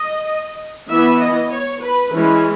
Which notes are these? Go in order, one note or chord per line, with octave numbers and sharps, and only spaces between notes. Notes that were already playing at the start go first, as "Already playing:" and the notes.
Already playing: D#5
E3 B3 E5
D#5
C#5
B4
E3 G#3 C#4 E4